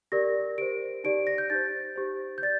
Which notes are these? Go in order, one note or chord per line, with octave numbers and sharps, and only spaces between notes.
G4 A#4 D5 A#6
G4 C5 D7
D#4 G4 D5 D7
A#6
G6
D#4 G4 C5 A6
G4 C5
G6
D5 A6